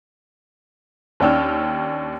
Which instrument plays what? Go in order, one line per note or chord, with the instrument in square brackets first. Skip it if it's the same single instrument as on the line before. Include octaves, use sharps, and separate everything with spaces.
[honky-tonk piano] D#2 C#4 D4 G5 E6 F6